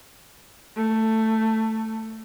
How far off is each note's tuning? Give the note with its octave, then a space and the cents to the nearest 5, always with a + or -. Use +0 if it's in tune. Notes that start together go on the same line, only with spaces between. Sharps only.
A3 +10